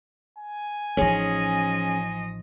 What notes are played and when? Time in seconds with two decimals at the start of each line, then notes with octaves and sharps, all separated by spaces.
0.38 G#5
0.97 A1 F3 C#4 D#4 G#4 D#5